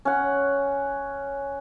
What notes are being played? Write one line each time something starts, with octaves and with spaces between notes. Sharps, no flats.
C#4 F#5